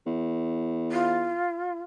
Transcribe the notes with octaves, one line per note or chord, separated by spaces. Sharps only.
E2
F4